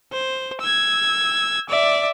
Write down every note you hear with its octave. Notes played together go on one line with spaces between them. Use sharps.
C5
E6 G#6
D5 E5